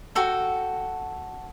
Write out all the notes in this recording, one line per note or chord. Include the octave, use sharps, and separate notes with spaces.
F#4 A4 G5